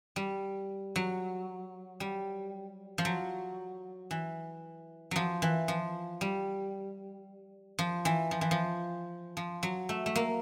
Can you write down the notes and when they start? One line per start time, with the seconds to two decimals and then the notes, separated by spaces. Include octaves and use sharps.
0.16 G3
0.96 F#3
2.00 G3
2.98 F3
3.05 F#3
4.11 E3
5.11 F3 F#3
5.42 E3
5.68 F3
6.21 G3
7.79 F3
8.05 E3
8.31 F3
8.41 E3
8.51 F3
9.37 F3
9.63 F#3
9.89 A3
10.06 A3
10.15 A#3